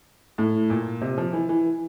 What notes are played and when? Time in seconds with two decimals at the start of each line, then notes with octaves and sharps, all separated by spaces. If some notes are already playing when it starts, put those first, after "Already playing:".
0.38 A2
0.70 A#2
1.01 C3
1.18 F3
1.33 E3
1.49 E3